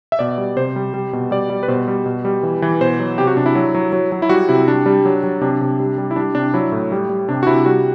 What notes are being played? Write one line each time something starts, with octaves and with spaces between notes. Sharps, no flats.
E5
B2 D5
G3
C3 C5
G3
G3
B2
G3 D5
G3
B4
B2 C5
G3
B2
G3
E3
E3
B2 C5
F#3
C3 G4
F#4
C3 D4
E4
F#3
F#3
F#3
F#3
E4
G3 F#4
C3 E4
G3 D4
G3
F#3
F#3
C3 D4
C3
G3
G3
E4
G3 D4
C3 D4
F#3 E4
A2
G3
G3
C3 D4
F#4
C3 E4
G3 F#4